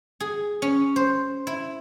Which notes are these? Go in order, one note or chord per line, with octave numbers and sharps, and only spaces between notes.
G#4
C#4
C5
E4